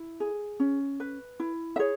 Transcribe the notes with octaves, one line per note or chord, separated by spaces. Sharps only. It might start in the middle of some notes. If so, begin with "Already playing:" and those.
Already playing: E4
G#4
C#4
B4
E4
E5
G#4 C#5